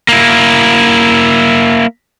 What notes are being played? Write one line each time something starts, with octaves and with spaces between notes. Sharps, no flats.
A#3 E4